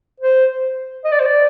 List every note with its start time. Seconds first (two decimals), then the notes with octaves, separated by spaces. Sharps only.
0.20 C5
1.04 D#5
1.12 D5
1.20 C5
1.26 D5